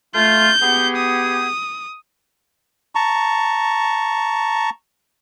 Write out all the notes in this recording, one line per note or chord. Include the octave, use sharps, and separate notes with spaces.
A3 F4 G6
B3 G4 G#4
D#6
A5 A#5 C#6